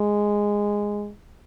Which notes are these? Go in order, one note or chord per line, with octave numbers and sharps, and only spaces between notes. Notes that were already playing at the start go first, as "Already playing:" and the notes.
Already playing: G#3